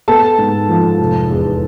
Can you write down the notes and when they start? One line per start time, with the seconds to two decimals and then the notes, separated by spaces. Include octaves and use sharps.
0.08 B3 A4 A5
0.38 G#2
0.69 F3
0.99 F1
1.30 E2